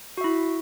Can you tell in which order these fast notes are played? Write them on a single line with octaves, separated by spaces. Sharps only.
F#4 E5 E4